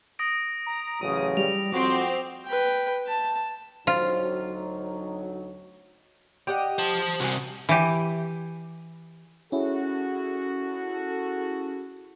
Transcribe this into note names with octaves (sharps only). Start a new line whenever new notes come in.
D#6 A#6 D7
A#5
A1 C#3 F#3 D#6
G3 F7
F2 C4 F#4 D6
B4 G5
A5
D2 F#3 C4 D#4 F4
G4 D#5 F#5
C5 A5
C2 C3 F#4 C5 G#5
E3 G4
C#4 E4 F#4 G#4 A4